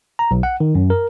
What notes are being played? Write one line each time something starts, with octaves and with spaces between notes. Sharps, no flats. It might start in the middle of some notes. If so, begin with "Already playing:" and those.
A#5
B1
F#5
D#3
F#2
A#4